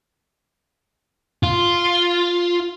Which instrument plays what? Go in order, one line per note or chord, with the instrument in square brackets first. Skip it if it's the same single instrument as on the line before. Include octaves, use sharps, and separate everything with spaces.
[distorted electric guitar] F4